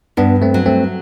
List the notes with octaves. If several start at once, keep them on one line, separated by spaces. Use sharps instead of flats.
G2 B3 D4
A3 C4
F#3
A3 C4